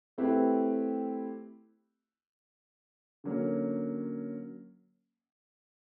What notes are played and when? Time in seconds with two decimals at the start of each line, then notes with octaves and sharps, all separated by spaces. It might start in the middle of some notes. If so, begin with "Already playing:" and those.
0.18 A3 C4 E4 G4 B4
3.24 D3 F#3 A#3 C#4